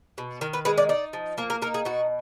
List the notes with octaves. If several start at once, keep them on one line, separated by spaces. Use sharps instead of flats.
B2
D#3 A#4
B4
G#3 B4
D5
D#4 D5
F3
A#3 A#4
A#4
D#4 A#4
G#4
B2 F#4